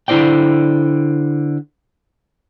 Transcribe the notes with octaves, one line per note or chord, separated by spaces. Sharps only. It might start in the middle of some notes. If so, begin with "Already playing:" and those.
D3 E4 C5 D5 G5